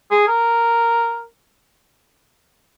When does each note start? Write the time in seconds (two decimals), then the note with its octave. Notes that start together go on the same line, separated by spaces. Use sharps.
0.11 G#4
0.28 A#4